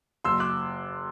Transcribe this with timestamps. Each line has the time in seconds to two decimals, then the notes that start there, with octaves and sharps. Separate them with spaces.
0.25 F#1 C6 E6
0.40 D6 F#6